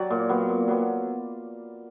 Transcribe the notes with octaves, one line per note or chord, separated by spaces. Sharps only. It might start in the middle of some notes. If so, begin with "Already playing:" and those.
Already playing: F#3 D5
A#2
F#3 B3
A#2
F#3 B3